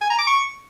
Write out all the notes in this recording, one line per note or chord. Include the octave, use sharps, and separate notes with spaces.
G#5
A#5
D6
C#6